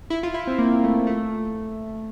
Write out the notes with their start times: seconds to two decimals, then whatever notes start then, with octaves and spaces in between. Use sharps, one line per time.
0.10 E4
0.23 F4
0.34 E4
0.47 C4
0.58 A#3
0.84 A3
1.07 A3